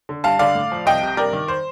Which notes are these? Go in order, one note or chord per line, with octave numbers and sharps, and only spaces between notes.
D3
G2 F5 A5
D3 D5 F5
A2
F3
C2 D#5 G5
C3
G2 A#4 D5
D#3
C5